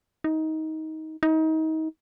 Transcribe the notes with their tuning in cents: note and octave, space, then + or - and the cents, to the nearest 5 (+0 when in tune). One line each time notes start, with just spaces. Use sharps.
D#4 +20
D#4 +30